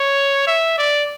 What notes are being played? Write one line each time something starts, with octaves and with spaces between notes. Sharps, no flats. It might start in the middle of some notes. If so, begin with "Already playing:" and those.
Already playing: C#5
E5
D5